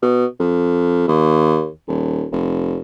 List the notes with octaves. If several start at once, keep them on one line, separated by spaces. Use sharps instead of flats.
B2
F2
D#2
D#1
F1